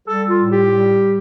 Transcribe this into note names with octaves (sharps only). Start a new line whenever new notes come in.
G3 A4
F4
A2
G4
G3